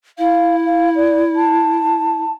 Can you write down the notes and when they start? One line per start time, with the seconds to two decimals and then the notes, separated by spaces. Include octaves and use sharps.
0.18 E4 F5
0.65 F5
0.96 D5
1.36 A5